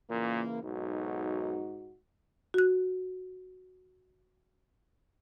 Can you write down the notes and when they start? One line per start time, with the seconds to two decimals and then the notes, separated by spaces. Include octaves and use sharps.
0.10 A#2 C#3 E3 A#3
0.63 B1 G#2 D#4 F#4
2.54 F#4 F#6